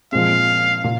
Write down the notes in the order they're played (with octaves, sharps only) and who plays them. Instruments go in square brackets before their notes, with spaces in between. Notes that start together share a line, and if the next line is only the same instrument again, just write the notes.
[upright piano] A#2 F3 G#3 C4 [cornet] F5
[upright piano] A#2